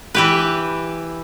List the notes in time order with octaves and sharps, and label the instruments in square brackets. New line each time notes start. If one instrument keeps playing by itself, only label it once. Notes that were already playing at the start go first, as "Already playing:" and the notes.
[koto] E3 G4 B4